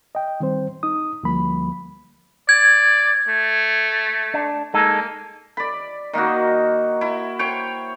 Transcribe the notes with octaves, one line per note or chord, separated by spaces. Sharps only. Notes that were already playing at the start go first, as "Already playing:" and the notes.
D#5 G5
D#3 G3 C4 C5
D#4 D#6
D2 F3 G3 A#3 B5
D5 G#6
A3
D4
G#3 A#3 D#4 A4
D5 B5
D#3 A#3 D#4 F#4
E4
C5 C#5 G5